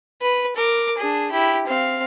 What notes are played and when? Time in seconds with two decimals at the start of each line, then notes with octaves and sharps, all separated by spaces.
0.22 B4
0.56 A#4 D6
0.98 D4 G#4
1.32 E4 G4
1.67 C4 F5